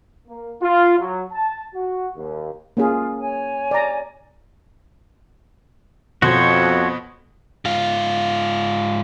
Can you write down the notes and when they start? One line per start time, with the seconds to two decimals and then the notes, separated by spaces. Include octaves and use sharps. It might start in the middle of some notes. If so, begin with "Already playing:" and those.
0.28 A#3
0.62 F4
0.99 F#3
1.32 A5
1.75 F#4
2.16 D#2
2.77 A#3 C#4 F4 G#4
3.18 C#5 G#5
3.71 D5 A#5
6.22 F2 B2 F#4 C5 C#5
7.65 G#2 F4